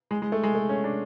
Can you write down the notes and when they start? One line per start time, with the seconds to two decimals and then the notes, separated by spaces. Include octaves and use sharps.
0.11 G#3
0.22 G#3
0.32 A3
0.43 G#3
0.55 A3
0.69 C#4
0.84 D4